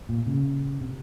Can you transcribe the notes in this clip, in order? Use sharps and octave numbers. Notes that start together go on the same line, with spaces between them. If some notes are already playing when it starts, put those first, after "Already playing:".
A#2
C#3
C3